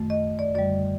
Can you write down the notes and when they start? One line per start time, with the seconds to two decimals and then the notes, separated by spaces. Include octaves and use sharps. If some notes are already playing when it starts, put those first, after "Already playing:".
Already playing: F#2 D#3 A3
0.10 D#5
0.39 D5
0.55 F#2 D3 G3 D5